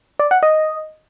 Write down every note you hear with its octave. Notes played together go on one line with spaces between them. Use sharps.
D5
F#5
D#5